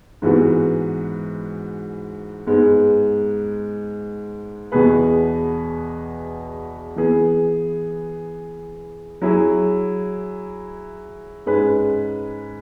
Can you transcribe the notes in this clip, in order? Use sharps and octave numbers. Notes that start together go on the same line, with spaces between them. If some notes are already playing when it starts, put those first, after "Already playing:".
G#2 E3 G#3 B3 F#4
G#2 G#3 B3 G#4
E2 B2 B3 G#4 B4
E3 B3 G#4
F#3 E4 G#4
G#2 G#3 C#4 G#4 B4